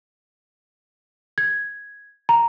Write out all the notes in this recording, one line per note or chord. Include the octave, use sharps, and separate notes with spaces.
G#6
A#5